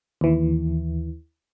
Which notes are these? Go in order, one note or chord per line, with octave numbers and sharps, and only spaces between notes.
D#2 E3